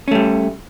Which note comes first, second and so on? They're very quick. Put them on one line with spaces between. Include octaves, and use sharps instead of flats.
C#4 A3 G3